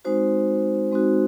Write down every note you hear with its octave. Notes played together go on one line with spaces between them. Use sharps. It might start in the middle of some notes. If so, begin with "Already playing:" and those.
G#3 C4 D#4 F#4 C5
G#3 C4 D#4 F#4